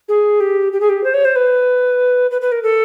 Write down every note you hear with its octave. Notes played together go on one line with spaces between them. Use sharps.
G#4
G4
G4
G#4
G4
C5
C#5
C5
B4
B4
B4
A#4
A4